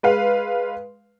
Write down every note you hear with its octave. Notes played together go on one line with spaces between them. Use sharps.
G#3 B4 F5